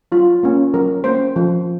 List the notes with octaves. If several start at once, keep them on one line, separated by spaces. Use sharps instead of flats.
F#3 F4
A#3 C#4
F#3 A#4
A#3 C#4 C5
F3